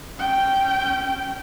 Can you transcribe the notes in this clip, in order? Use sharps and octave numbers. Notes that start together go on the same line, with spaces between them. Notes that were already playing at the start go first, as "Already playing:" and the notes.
C#4 G5